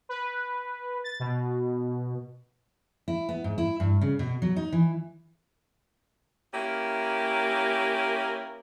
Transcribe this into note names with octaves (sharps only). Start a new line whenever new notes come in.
B4
A6
B2
E4
B3
G#2
E4
G2
C#3
B2
F#3
D#4
E3
A#3 C#4 E4 G4 A#4